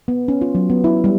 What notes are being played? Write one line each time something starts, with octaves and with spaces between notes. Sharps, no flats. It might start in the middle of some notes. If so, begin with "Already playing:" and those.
B3
C#4
F4
F#3
B3
E4
G3